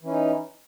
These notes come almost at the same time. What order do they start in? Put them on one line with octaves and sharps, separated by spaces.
E3 C#4 D#4